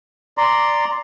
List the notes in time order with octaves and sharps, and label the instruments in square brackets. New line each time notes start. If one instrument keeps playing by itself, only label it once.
[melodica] D5 A#5 C6